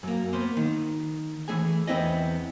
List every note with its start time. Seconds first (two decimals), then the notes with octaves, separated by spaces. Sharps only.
0.03 F#2 A#3
0.33 A#3 B3 C5
0.57 D#3
1.48 E3 A3 G#4 G#5
1.87 E2 B2 B3 C4 E4 D#5